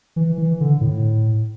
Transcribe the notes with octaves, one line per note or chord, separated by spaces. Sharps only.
E3
E3
D3
A2